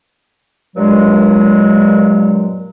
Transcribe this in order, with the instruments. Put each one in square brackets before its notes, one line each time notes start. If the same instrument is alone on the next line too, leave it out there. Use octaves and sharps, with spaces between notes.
[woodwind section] G2 A#2 F#3 G#3